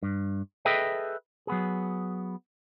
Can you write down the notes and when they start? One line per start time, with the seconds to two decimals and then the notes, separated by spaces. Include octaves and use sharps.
0.03 G2
0.65 G#4 A4 B4 D#5 E5 G5
1.47 F#3 B3 G#4